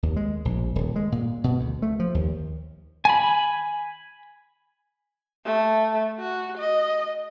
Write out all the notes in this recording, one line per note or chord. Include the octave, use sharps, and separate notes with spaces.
D#2
G#3
A#1
D#1
G#3
A#2
B2
D2
A3
F3
D#2
G#5 B5
A3
F#4
D#5